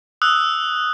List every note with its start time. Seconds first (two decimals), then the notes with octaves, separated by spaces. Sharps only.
0.22 D#6 E6 F#6